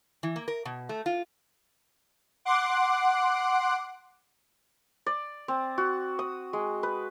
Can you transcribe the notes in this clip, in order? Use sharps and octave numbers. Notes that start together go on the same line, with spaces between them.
E3
A#3
A#4
B2
A3
F4
F#5 C6 D6
D5
C4
F#4
D#6
G#3
B4